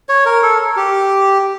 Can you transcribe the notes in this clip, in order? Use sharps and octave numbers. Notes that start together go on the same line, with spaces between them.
C#5
A#4
A4
G4